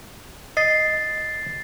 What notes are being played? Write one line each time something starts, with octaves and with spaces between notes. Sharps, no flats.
D#5 A6 C7